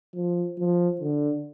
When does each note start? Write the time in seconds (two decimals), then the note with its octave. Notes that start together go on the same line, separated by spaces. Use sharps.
0.15 F3
0.59 F3
1.01 D3